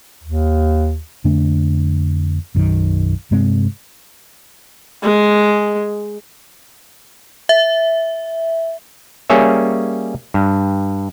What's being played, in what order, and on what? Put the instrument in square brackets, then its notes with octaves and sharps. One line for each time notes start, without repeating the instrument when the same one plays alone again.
[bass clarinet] D#2
[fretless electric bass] F2 D3 A3 D4
B1 F#2 D#3
G2 C3 G#3 C4
[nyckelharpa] G#3
[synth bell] E5
[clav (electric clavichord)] G3 A#3 C#4 G#4 C#5 E5
G2